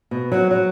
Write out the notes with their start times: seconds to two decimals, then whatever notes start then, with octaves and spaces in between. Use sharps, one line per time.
0.11 B2
0.32 F#3
0.51 F#3